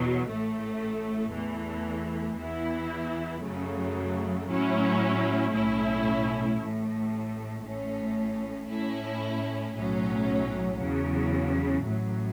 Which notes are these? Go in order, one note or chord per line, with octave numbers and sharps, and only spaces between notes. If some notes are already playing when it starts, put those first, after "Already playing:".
Already playing: E2 B2 F#3
A1 A2 A3
E2 E3 A3
E2 E3 B3 E4
F#2 C#3 F#3 A3
A2 F#3 C#4 E4
B1 A2 A3 C#4 E4
A1 A2 A3
A1 A2 A3 C#4
A2 A3 C#4 E4
B1 A2 F#3 C#4
E2 C#3 F#3
A1 A2 F#3